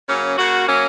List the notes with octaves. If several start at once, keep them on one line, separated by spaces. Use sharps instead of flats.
C#3 F#3 A#3 C#4
C#3 A#3 F#4
F#3 A#3 C#4